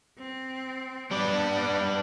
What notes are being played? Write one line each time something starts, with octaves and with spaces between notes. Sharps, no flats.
C4
G3 B3 D4 D5